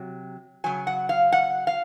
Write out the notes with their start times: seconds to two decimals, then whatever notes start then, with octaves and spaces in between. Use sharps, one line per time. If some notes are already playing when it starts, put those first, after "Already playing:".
Already playing: C3 F#3
0.64 C#3 F#3 G#5
0.87 F#5
1.09 F5
1.32 F#5
1.67 F5